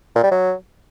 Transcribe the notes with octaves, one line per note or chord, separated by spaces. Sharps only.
A#2
G3
F#3